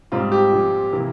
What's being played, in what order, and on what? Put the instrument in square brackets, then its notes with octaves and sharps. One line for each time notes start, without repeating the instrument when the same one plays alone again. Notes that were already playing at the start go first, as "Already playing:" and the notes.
[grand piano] G#2 G3 C4 F4
G4
A#2 F3 C4
C3 E3 A#3